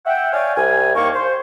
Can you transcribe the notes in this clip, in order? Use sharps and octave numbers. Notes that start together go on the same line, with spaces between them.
E5 F#5 G5
C#5 D5 E5 F5 G5 G#5
C2 G#5
D#2 A#3 C#6
C5